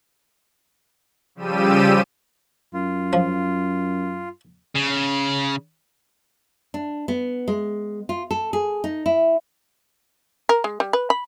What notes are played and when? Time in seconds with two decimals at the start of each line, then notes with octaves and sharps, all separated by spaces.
1.35 C#3 F3 G3 G4 E6 D#7
2.74 F#2 F4
3.13 F3
4.75 C#3
6.74 D4
7.08 B3
7.48 G#3
8.09 F4
8.31 A4
8.53 G#4
8.84 D#4
9.06 E4
10.49 A#4
10.64 G#3
10.80 G3
10.93 B4
11.10 B5